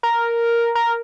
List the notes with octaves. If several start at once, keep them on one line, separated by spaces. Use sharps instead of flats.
A#4
A#4